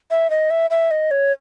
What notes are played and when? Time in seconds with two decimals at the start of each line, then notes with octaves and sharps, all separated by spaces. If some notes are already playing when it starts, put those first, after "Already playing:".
0.11 E5
0.30 D#5
0.50 E5
0.70 E5
0.91 D#5
1.11 C#5